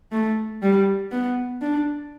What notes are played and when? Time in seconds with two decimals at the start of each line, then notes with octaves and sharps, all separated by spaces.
0.12 A3
0.63 G3
1.12 B3
1.61 D4